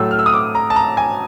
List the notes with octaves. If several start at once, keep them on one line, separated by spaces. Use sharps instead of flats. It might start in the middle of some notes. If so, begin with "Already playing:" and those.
Already playing: A2 F#3 A3 E6
F6
E6
D#6
D6
A#5
A5
A#5
G#5